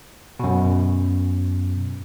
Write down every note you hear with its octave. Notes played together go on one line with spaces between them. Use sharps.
F#2 B2